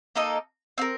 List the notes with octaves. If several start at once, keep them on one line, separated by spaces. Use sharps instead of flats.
A#3 D#4 A4 D#5
C4 F4 A#4